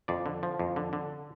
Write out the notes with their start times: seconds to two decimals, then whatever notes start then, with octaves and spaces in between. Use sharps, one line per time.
0.08 F2 D5
0.26 D3
0.43 F3
0.59 F2
0.76 D3
0.93 D3